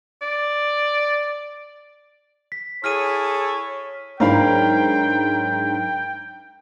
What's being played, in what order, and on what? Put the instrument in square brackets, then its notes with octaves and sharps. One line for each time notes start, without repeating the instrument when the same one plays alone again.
[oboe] D5
[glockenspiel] B6
[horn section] E4 G#4 A4 [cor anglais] C#5 [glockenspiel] F6 B6 D#7
[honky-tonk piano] G#2 [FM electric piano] F#3 D4 C#5 [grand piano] A#4 F5 B5 [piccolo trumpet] G5